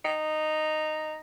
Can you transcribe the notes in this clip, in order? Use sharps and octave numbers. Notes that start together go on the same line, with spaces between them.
D#4